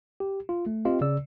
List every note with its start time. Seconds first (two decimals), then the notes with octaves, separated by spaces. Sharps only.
0.20 G4
0.49 F4
0.66 A3
0.85 C4 F4 G4 D#5 F5
1.01 C#3 D5 E6